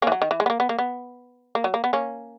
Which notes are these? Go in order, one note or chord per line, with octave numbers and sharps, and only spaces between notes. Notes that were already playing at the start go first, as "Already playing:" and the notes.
E3 A#3 C#4
F#3
D#3
E3
G#3
B3
A#3
B3
A#3
B3
A#3
F#3
A#3
B3
A#3 C#4